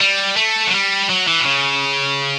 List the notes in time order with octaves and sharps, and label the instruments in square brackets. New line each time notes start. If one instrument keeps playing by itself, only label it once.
[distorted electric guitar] G3
A3
F#3
G3
F#3
E3
B2
C#3